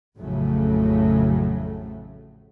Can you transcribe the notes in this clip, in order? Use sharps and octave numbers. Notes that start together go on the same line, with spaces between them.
A1 F2 A2 C#3 F#3 A3